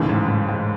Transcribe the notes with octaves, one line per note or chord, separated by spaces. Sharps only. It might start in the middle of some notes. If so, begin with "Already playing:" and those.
Already playing: E1 D#2 A2 C#3 E3 G#3
G#2
G#2
G#2